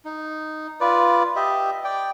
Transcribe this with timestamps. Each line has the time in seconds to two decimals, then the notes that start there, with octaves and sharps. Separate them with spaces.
0.05 D#4
0.80 F4 B4 D5
1.36 G4 D#5 E5
1.84 D5 G5